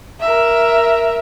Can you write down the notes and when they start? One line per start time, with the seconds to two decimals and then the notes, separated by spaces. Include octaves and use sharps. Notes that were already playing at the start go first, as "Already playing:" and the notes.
0.20 A#4 E5